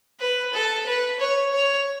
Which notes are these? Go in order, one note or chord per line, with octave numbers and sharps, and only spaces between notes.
B4
A4
B4
C#5
C#5